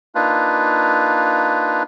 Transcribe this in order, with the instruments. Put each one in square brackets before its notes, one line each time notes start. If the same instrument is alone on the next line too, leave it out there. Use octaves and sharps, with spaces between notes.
[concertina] A#3 D4 D#4 F4 B4